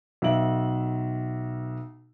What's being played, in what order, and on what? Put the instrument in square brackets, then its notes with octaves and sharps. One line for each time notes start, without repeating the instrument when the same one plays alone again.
[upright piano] B1 E5 F#7